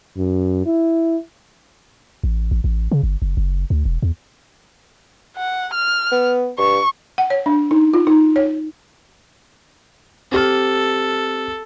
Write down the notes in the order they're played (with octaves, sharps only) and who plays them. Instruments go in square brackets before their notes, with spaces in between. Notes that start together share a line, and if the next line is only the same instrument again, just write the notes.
[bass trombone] F#2
E4
[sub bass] A1
A1
A1
C#3
G1
F#1
F#1
D2
E1
E2
[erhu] F#5
F6
[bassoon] B3
[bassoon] G2 [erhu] C#6
[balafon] F#5
C#5
D4
D#4
F4
D#4
C#5
[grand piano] C4 G4 F6 [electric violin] A4